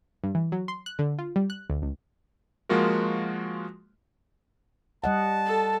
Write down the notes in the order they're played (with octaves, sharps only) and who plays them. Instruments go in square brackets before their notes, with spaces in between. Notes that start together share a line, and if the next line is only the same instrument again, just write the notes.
[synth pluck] G2
E3
F#3
C6
F#6
D3
F4
G3
F#6
D2
C#2
[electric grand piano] F3 G#3 A#3 F4 F#4 A#4
[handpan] G3 D#5 F#5 [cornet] A5
[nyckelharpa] A4